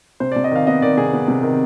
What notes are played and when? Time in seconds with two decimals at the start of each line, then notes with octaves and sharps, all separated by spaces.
0.20 C3 C5
0.32 C3 D5
0.44 D#5
0.52 D#3 F5
0.67 B3 D#5
0.82 D#3 D5
0.98 C3 G#4
1.13 B3
1.28 C3
1.43 D#3